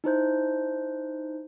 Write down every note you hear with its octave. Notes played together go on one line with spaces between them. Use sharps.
D#4 E4 C5 G6